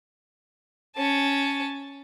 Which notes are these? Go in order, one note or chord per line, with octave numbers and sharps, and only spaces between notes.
C#4 A5